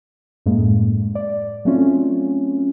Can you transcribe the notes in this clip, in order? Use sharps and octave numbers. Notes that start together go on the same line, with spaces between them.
F#2 A2 G#3 A#3
D5
F#3 A3 C4 C#4 F4